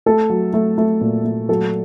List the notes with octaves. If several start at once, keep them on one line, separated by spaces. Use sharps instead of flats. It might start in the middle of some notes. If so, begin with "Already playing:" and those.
A3 A4
F#3
A3
A3
A#2
A3
F#3 A4